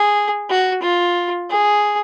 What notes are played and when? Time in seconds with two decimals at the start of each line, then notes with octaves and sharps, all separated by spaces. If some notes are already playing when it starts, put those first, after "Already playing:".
Already playing: G#4
0.49 F#4
0.82 F4
1.50 G#4